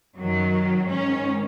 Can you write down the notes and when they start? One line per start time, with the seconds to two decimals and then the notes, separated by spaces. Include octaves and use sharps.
0.17 F#2 D#3 F#3
0.88 G#2 D#3 C#4